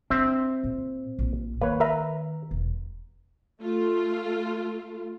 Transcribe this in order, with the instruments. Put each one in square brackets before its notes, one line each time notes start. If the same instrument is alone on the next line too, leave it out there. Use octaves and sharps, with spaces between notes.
[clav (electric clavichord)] C4 E5 [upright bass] D4
[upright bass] A#2
A#1
[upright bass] D#3 [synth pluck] A#3 [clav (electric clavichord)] B4 C#5
[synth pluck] A#4 E5 A#5 [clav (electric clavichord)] B4
[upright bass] E1
[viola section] A3 F4